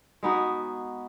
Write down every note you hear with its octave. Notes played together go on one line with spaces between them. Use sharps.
G#3 B3 D#4 F#4